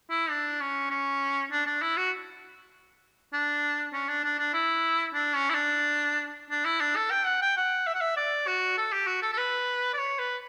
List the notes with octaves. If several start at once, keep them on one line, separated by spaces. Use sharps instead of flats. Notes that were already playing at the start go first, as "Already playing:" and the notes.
E4
D4
C#4
C#4
D4
D4
E4
F#4
D4
C#4
D4
D4
D4
E4
D4
C#4
E4
D4
D4
E4
D4
A4
G5
F#5
G5
F#5
E5
F#5
E5
D5
F#4
A4
G4
F#4
A4
A4
B4
D5
C#5
B4